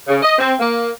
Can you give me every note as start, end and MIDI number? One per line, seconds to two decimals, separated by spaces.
0.08 0.22 49
0.23 0.35 75
0.39 0.54 60
0.60 0.90 58